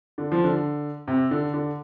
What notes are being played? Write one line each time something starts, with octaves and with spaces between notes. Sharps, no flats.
D3
F3
D3
C3
D3
D3